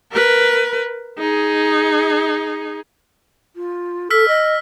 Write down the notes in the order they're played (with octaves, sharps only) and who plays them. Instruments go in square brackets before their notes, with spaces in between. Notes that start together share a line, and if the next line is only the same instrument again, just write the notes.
[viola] A#4 B4
D#4 G#4
[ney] F4
[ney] A4 [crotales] E6 F6 B6
[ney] D#5